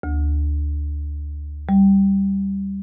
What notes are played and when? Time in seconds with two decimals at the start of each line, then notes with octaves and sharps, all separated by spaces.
0.03 D2
1.69 G3